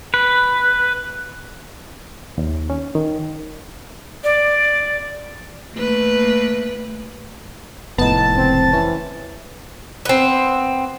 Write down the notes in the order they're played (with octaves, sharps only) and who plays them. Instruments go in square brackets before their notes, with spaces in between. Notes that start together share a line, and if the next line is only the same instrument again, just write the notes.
[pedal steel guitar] B4
[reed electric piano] D#2
C#4
D#3
[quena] D5
[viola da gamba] A3 A#3 B4
[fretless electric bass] F1 A2 [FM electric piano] B3 D#4 [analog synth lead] A5
[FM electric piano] C#2 [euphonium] C4
[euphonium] E3 [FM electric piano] C#4
[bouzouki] B3 C4